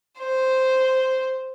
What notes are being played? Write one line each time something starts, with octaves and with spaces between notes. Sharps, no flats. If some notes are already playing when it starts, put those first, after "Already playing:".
C5